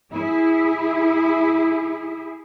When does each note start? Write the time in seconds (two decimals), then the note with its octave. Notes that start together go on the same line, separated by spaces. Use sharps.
0.13 E4 G#4